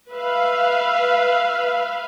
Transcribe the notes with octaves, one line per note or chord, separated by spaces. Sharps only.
B4 E5 F5